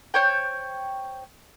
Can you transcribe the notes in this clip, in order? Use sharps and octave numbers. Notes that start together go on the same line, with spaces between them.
C5 C#5 G5